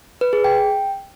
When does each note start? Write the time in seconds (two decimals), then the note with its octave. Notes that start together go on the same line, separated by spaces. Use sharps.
0.21 B4
0.33 G#4
0.44 G5